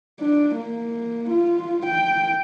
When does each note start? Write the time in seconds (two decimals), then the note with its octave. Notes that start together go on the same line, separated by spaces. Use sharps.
0.20 D4
0.55 A#3
1.30 F4
1.86 G5